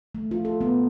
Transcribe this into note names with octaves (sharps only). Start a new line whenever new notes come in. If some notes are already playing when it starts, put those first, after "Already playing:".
A3
F4
A4
B3